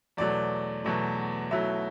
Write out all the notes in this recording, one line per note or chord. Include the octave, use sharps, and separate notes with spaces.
E2 B2 F#3 A3 D5
E2 B2 F#3 A3
B1 B2 F#3 A3 E4 E5